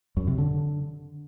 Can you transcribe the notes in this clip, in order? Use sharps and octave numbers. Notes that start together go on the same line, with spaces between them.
F#2
C3
D3